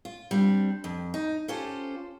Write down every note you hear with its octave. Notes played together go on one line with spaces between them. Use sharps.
F4
G3 C4 D4
F2
D#4
C#4 F4 G4 A4 C5